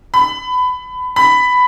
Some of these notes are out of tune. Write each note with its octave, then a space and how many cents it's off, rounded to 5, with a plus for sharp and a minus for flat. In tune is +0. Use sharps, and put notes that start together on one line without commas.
B5 +20
B5 +10